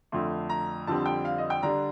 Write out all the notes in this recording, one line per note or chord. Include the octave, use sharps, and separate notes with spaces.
F2 D3 A3 C6
A#5
F2 D3 G3 C4 A5
G5
F5
D#5
G5
D3 G3 D4 A#5